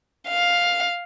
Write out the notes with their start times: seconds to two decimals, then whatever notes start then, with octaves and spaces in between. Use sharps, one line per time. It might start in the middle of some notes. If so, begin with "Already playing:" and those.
0.29 F5